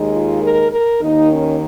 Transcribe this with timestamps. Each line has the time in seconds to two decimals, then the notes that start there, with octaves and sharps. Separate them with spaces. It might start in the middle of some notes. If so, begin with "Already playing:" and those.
Already playing: D#2 D#3 G#3
0.12 F4
0.41 A#4
0.71 A#4
1.00 D#2 D#3 A#3 D#4
1.30 C#4